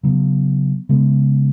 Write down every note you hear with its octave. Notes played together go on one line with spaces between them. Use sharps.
C#3 F#3 B3
C#3 G#3 B3